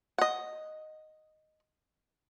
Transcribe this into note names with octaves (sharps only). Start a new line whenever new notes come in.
D#5 F#5